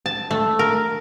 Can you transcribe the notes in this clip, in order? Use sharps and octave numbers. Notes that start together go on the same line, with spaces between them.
A5
A3
A#4